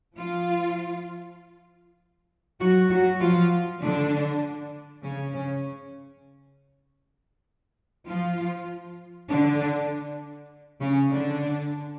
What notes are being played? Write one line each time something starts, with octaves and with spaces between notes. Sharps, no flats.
F3 F4
F#3 F#4
F#3 F#4
F3 F4
D3 D4
C#3 C#4
C#3 C#4
F3 F4
D3 D4
C#3 C#4
D3 D4